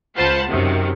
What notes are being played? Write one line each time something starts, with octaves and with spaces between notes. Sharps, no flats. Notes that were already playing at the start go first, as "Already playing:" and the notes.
C#2 F4 C5 F#5 A5 B5
F#2 C3 D#3